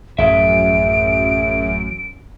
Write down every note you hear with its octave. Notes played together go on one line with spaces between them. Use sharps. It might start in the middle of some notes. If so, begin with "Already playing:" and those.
A1 F#2 G#4 E5 D7